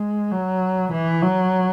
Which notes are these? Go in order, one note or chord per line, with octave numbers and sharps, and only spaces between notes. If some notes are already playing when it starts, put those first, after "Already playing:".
Already playing: G#3
F#3
E3
F#3